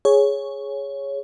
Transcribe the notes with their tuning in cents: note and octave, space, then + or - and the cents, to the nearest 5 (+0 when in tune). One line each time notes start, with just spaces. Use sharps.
G#4 +0 C#5 +0